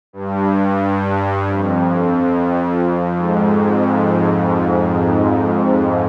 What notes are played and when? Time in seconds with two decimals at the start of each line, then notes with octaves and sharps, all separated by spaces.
0.13 G2
1.47 F2
2.83 F2
3.16 G#2